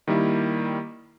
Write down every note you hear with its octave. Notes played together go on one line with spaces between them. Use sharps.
D#3 G3 A#3 E4